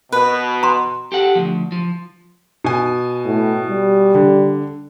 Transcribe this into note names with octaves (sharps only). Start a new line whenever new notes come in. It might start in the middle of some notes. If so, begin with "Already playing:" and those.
B2 B4
A#5 C6
G4 A4 F#5
D2 A#2 F3
F3
B2 G#5
A2
G3
D3